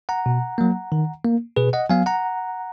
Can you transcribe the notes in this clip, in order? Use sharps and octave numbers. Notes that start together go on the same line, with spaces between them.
F#5 A#5
B2
F#3 A#3
D#3
A#3
B2 G#4 B4
D#5 F#5
F#3 B3 F5 G#5
F#5 A#5